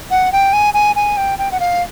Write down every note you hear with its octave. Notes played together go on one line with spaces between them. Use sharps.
F#5
G5
G#5
G#5
G#5
G5
G5
F#5
F5